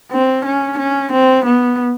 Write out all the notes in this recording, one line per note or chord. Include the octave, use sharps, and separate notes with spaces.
C4
C#4
C#4
C4
B3